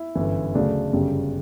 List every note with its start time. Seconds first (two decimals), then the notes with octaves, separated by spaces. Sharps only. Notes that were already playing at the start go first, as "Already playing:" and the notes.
Already playing: E4
0.15 G1 F#2 E3
0.54 D2 C#3 F#3 A3 D4
0.93 G1 F#2 C#3 G3